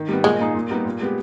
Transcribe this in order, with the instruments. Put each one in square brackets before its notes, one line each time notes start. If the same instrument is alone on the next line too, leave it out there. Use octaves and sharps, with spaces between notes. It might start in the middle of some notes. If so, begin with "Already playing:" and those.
Already playing: [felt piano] D#3
G3 B3
[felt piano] A#2 [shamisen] G#3
[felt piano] A#3 D#4 G#4
A#2
G3 B3 D#4 G4
A#2
G#3 B3 G4